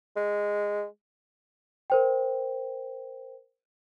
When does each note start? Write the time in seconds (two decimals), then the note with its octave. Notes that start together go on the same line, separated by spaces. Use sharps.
0.17 G#3
1.90 A#4 C5 G5